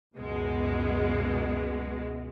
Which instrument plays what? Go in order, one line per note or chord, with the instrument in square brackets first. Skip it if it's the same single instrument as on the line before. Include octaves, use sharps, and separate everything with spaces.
[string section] C#2 F#2 B2 G#3